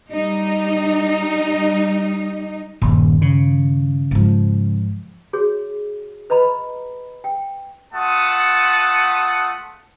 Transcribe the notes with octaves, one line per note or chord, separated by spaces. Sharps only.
G3 D#4
D#1 G2 D#3
C#3
G#2 F3
F#4 G#4 C#5
B4 D#5 A#5 B5
G5
A3 F4 F#5 A5 D#6